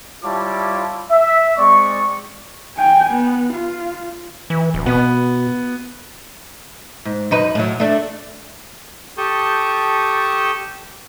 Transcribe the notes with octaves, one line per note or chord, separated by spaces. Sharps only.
G3 E4 F4 C#5 A5 D6
E5
G#3 C4 D5 C#6
G5 G#5
B3
F4
E3
D1
B2 B3
G#2
F#2 D#4 B4
A2 F#3
A3 D4
G4 A4 A5 C#6 D#6 G6